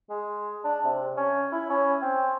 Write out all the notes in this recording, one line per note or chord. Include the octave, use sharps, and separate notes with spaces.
G#3
D4
C3
C#4
E4
C#4
C4